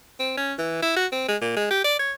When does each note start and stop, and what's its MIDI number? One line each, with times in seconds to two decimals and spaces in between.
0.20 0.33 60
0.37 0.54 61
0.58 0.78 52
0.83 0.95 64
0.96 1.06 66
1.12 1.27 60
1.28 1.37 56
1.41 1.52 46
1.56 1.66 56
1.70 1.83 67
1.84 1.96 74
1.99 2.13 73